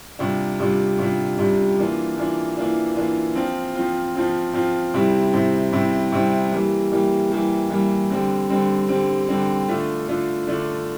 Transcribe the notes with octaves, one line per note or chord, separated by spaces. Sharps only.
C3 G3 D4 F4
C3 G3 D4 F4
C3 G3 D4 F4
C3 G3 D4 F4
E3 A#3 D4 F4
E3 A#3 D4 F4
E3 A#3 D4 F4
E3 A#3 D4 F4
F3 C4 F4
F3 C4 F4
F3 C4 F4
F3 C4 F4
C3 G3 C4 E4
C3 G3 C4 E4
C3 G3 C4 E4
C3 G3 C4 E4
E3 G3 A#3
E3 G3 A#3
E3 G3 A#3
E3 G3 A#3
D3 G3 C4
D3 G3 C4
D3 G3 C4
D3 G3 C4
D3 A3 D4 F4
D3 A3 D4 F4
D3 A3 D4 F4